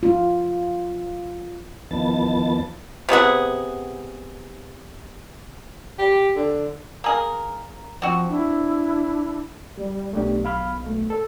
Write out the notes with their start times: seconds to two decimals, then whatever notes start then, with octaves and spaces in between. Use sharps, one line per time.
0.03 F4
1.91 E2 D#3 F3 B3 A5 A6
3.09 C3 B3 G#4 F#5
5.99 G4
6.36 D3
7.04 A#3 G#4 A#4
8.02 F3 C4 F#4
8.30 D4 E4
9.77 G3
10.13 B1 A3 D4 G4
10.45 F5 B5 F6
10.86 A3
11.10 A4